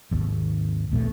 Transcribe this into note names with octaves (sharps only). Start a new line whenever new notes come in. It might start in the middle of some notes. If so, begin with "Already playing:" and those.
G#1 D#2
A#1 D#2 B2 A3